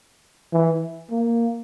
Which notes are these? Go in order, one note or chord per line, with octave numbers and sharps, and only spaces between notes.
E3
A#3